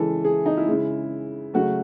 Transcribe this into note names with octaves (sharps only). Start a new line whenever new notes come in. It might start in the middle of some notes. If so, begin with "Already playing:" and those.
Already playing: C#3 E3 G#3 A4
G#4
D#4
E4
C#3 G#3
C#3 F#3 A3 F#4